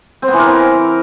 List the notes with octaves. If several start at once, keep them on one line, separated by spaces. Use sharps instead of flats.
C4
B3
E3
A#4
C4